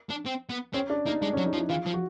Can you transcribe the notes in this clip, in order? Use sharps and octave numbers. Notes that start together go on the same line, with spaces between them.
D4
C4
B3
C4 C#4
D4
A#3 D#4
G#3 D4
C#4
F#3
D#4
F3
E4
E3 F4
F3
F#4